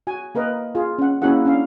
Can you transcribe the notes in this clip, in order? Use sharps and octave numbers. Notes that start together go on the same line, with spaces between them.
F#4 G#5
A#3 A#4 B4 D#5
F4 G#4
C#4 F#5
A#3 C#4 E4 F#4 G#4 F#5
C#4 D4 F5